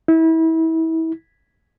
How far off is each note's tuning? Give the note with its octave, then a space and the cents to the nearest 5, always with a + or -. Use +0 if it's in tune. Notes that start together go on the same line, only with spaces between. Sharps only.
E4 -30